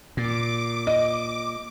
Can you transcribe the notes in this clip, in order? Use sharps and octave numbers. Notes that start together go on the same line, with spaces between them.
A#2 D6
D#5